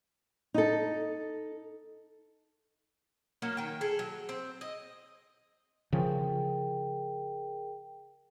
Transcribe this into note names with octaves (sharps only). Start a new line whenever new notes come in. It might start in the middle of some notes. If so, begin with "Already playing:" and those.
D#4 A4
F#3 A#3 C#4
D#3 G5
G#4 A4
F#3
C4
D#5
C#3 F3 G#4 A#4 G5